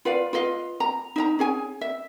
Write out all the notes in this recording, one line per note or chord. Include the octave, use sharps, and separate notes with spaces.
F4 B4 D5 F5
F4 B4 D#5 F5
A#5
D#4 E5 A#5
C#4 G#4 G#5
E5